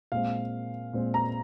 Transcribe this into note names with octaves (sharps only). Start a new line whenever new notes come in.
A#2 G#3 C4 F5
A#2 G#3 C4
A#5